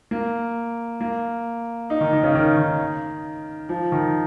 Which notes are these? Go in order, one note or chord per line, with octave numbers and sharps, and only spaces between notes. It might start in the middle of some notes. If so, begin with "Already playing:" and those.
A#3
A#3
D#4
D#3
D#3
C#3
D#3
D#3
F3
D#3